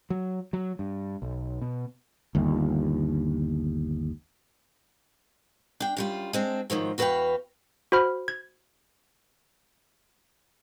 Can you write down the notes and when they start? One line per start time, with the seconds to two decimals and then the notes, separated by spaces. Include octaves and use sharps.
0.10 F#3
0.53 F#3
0.79 G2
1.22 B1
1.62 B2
2.35 G1 D#2
5.80 D4 G5
5.97 F#2 G3 F4
6.33 G#3 C4 D4
6.70 G#2 D#3 F3 F#3
6.98 E2 F#4 B4 D#5 F5 G5
7.92 F#4 C5 B5 F6
8.28 G#6